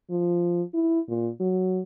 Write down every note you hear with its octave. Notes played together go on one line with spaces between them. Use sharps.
F3
E4
A#2
F#3